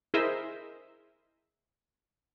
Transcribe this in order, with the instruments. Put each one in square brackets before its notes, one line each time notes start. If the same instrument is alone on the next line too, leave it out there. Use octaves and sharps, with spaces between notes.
[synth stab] E4 G#4 A#4 C5 D#5 E5